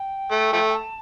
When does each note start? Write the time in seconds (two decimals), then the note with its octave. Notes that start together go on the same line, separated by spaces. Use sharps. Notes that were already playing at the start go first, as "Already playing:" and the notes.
Already playing: G5
0.31 A3
0.53 F3 A3
0.69 G5
0.75 A5